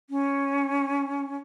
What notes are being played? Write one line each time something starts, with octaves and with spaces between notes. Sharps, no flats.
C#4